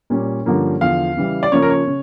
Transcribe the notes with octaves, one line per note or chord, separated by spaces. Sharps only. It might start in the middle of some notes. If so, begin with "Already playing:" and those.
A#2 G3 C#4
G2 D3 F3 A#3 C#4
E2 D3 F3 F5
C#3 E3 G3
D5
C#3 F3 A#3 C#4 C#5
A#4
C#5
C#3